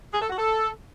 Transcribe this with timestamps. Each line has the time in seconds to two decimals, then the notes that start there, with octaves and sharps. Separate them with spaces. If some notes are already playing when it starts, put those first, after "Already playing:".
0.13 G#4
0.21 A4
0.30 F#4
0.38 A4